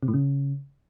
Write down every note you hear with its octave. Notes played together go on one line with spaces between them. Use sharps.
C3
A2
C#3